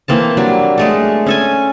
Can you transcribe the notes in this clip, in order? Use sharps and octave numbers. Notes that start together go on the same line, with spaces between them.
E3 A#3 C4 A5
F#3 G3 D4
G#3 A3 A4
C#4 A4 G#5